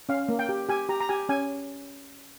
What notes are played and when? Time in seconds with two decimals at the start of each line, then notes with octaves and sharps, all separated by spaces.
0.09 C#4 F5
0.29 A#3
0.39 G5
0.49 G4
0.69 G4 G#5
0.89 G4 A#5
1.00 A#5
1.09 G4 G#5
1.29 C#4 G#5